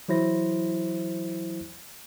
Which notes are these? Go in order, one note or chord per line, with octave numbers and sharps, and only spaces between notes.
E3 F#3 E4 C5 A#6